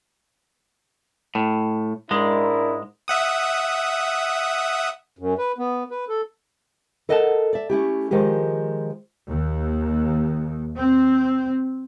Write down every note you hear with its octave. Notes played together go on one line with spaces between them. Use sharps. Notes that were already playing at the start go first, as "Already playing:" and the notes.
A2
G#2 G#3 D4 E4 A#4
E5 F#5 D#6
F#2
B4
B3
B4
A4
A4 A#4 D#5 F#5 G5 A5
D5 E5
A3 C#4 E4 G4
D#3 F3 G#3 G4
D#2
C4